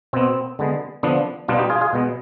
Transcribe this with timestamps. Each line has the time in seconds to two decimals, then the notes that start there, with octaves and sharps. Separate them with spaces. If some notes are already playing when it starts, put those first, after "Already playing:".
0.13 B2 B3 C4
0.59 D3 G#3 B3
1.03 D3 F3 B3 D4
1.48 B2 G3 B3 D4 F4
1.59 D#4 G4
1.70 F4 G#4
1.81 F4 G#4
1.93 B2 G#3 B3